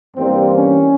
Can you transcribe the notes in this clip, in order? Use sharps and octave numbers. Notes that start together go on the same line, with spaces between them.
G2 E3 G3 A#3 C4
C#4